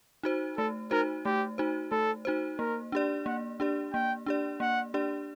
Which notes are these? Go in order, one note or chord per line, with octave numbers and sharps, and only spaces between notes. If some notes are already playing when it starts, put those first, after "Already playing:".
D#4 F#4 C5
A3 A4
D#4 F#4 A#4 C5
A3 G4
D#4 F#4 C5
A3 A4
D#4 F#4 C5
A#3 A#4
D4 G4 D5
A#3 F#5
D4 G4 D5
A#3 G5
D4 G4 D5
A#3 F#5
D4 G4 D5